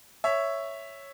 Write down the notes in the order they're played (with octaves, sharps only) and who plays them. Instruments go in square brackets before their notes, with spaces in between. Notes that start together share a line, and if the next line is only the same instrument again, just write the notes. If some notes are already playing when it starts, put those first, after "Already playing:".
[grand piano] C#5 E5